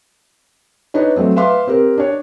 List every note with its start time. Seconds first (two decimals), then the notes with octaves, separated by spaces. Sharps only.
0.94 D4 D#4 B4 C#5
1.16 F#3 A3 C4
1.36 B4 E5 F5 C6 D6
1.67 C4 G4 A#4
1.98 D4 C#5